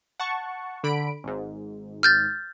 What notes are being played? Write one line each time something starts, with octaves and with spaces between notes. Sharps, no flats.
F#5 A5 C#6
D3 B5 D7
G#1 G#2
F6 G6 A6